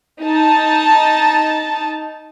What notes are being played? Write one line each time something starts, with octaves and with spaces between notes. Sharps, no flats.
D#4 A5